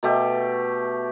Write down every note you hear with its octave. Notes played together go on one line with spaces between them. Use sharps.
B2 A3 G4